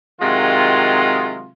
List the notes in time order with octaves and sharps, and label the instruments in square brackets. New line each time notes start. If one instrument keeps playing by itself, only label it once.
[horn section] C3 D#3 F#3 G#3 F4